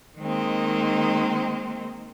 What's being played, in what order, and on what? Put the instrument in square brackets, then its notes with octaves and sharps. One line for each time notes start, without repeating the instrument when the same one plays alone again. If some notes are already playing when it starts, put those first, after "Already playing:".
[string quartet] D#3 G#3 A#3 C4 D#4